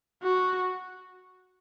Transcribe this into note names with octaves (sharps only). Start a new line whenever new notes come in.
F#4